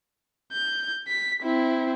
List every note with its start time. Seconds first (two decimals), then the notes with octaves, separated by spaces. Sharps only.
0.53 G6
1.08 B6
1.43 C4 E4